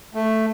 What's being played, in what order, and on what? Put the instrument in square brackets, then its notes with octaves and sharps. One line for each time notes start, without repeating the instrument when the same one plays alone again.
[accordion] A3